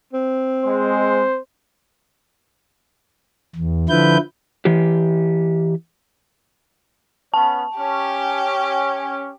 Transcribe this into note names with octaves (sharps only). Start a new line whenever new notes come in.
C4
G#3 C5
E2
D3 F3 E4 B4 G6
E3 G4
B3 C#4 A5
C#4 G4